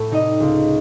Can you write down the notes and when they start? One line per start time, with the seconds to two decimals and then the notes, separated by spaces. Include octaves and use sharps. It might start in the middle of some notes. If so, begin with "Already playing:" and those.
Already playing: A2 A3 A4
0.11 C3 D#4 D#5
0.40 C#2